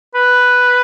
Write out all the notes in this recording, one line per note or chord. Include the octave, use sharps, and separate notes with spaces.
B4